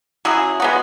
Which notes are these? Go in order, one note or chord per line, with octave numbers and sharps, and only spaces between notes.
F#3 C#4 E4 G#4
G#3 B3 F#4